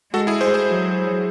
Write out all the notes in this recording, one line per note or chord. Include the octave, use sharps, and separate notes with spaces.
G#3 F#4 A4
E4 G#4
G#4 C5
G#4 C5
F#3